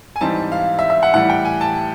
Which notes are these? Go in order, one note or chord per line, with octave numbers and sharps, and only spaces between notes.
G#5
G#2 E3 G3 C4 D#4 A5
F5
E5
E5
F#5
A2 E3 G3 F#5
G5
G#5
A5